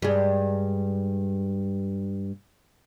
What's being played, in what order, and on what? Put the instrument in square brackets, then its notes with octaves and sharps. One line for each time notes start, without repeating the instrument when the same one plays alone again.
[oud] G2 G#3